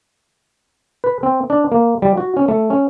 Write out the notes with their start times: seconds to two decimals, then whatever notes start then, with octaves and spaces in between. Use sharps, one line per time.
1.04 B4
1.23 C4
1.50 D4
1.72 A#3
2.02 G3
2.17 F#4
2.37 C#4
2.48 A3
2.70 C#4